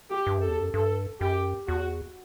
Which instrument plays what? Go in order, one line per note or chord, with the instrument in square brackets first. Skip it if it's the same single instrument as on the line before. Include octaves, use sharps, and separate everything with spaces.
[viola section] G4
[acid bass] G2
[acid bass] F#2 [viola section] A4
[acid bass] E2
F#2
[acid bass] G2 [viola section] A4
[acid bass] F#2 [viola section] G4
[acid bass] E2 [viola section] F#4